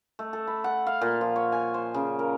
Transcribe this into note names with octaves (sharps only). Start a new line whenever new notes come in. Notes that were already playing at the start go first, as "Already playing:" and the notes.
A3
A4
B5
F#5
F5
A#2
F3
C#5
G#5
C5
C#3
A#4